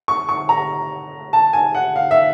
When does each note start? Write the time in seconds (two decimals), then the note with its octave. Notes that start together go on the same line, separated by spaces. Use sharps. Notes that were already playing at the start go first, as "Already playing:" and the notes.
0.08 C#6
0.29 C#6
0.49 A#5
1.33 A5
1.53 G#5
1.75 F#5
1.96 F5
2.11 E5